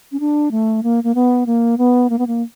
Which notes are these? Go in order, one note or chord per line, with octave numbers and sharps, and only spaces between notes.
C#4
D4
A3
A#3
A#3
B3
A#3
B3
A#3
B3
A#3